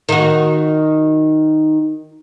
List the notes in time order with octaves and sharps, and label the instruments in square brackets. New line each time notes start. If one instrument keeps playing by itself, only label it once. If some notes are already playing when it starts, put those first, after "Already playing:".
[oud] D#3 F#4